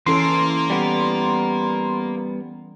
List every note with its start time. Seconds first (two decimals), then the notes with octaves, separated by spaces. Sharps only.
0.07 E3 A#3 C#4 A4 C6
0.70 G3 B3